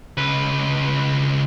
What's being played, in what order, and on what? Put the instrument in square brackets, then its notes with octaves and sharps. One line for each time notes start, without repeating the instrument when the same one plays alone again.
[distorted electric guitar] C#2 B4